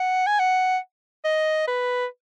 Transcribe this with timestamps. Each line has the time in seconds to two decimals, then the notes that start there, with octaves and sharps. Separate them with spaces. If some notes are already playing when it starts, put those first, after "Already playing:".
Already playing: F#5
0.26 G#5
0.39 F#5
1.25 D#5
1.67 B4